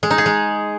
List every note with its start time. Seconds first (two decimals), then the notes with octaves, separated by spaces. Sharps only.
0.03 G#3
0.10 D#4
0.18 G#4
0.26 G#3